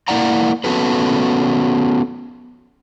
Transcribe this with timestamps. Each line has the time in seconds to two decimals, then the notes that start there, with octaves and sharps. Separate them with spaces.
0.08 A#3 E4 A#4 D5 F#5 A#5
0.64 B3 C#4 F#4 A4 B4